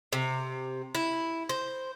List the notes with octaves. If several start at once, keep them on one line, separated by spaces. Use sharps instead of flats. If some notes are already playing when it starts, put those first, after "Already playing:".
C3
E4
C5